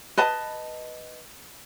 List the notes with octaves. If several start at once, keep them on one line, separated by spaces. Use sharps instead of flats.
B4 D#5 A5